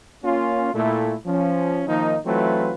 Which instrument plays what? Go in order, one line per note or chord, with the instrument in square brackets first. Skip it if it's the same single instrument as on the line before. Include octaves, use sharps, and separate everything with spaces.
[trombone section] A#3 C#4 F4
A#2 A3 E4
F3 C#4
D#3 F3 A#3 D#4
E3 F#3 A3 C4 F4 B4